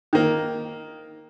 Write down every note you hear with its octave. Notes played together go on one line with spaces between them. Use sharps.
D#3 A#3